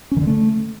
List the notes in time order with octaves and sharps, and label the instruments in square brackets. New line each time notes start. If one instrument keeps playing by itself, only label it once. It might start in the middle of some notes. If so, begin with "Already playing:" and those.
[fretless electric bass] C#4
D#3
D3
A3